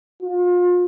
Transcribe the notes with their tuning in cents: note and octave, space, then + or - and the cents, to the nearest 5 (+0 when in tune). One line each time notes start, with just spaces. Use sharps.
F4 +30